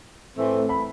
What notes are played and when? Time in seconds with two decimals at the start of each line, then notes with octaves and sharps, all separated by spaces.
0.35 A2 E3 A3 C4
0.69 B5